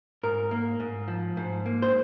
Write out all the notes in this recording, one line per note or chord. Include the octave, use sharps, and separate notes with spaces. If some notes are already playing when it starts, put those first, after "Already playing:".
G#2 A#4
A#3
G#2
F3
G#2
A#3
C5